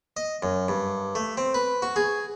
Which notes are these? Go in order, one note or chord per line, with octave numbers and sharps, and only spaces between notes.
D#5
F#2
G2
A3
C4
B4
F#4
G#4